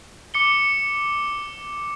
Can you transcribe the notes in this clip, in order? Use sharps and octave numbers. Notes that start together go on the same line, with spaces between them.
D6 C#7 G7